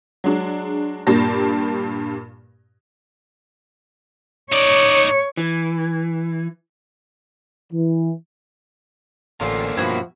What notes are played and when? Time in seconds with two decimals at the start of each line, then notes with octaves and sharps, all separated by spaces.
0.24 F#3 G#3 D4
1.07 G2 A#2 A#3 G4 A5 A#6
4.52 D#4 C#5 D5
5.37 E3
7.73 E3
9.41 A1 D3 A#3 C#4 F4 C5
9.77 G2 B2 F3 E4 F#4